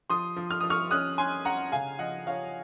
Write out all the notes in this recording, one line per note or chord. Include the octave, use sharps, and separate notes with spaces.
F3 C6 D#6
F3
F6
F3 D#6
C#6 F6
C#4 D#6 F#6
C#4 G#5 C6
C#4 F#5 A#5
C#3 F5 G#5
F3 D#5 F#5
F3 C#5 F5